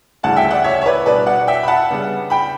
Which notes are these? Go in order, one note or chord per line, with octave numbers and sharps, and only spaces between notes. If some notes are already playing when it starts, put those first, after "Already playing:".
D2 C#3 E3 G3 F#5 A5
E5 G5
D5 F#5
C#5 E5
C#5
B4 D5
B2 G3 D4 B4 D5
D5 F#5
E5 G5
B5
F#5 A5
C#3 G3 B3 D4
G5 B5